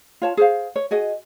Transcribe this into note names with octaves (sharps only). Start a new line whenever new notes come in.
F4 C#5 A5
G#4 C5 F5
C#5
F#4 G#4 D#5